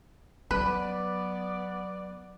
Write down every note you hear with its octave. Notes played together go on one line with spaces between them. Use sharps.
F#3 B3 B4 D5